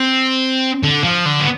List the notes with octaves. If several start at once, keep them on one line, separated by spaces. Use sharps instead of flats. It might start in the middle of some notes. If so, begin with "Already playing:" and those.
Already playing: C4
D3
F3
D3
B3